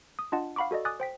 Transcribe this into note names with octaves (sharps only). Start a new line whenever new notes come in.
D#6
D4 F4 D#5 F#5 A5
F5 F#5 B5 C#6 D6
F#4 A4 D5 D#5
G#5 D6 D#6 F#6 A6
C5 G5 B6